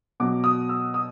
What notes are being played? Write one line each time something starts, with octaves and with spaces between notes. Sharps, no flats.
B2 F#3 D6
D#6
E6
D#6